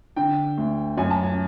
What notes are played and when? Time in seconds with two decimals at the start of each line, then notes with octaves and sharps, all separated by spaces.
0.16 D3 G5
0.58 D2
0.98 F#2 G#5
1.11 A5
1.23 G#5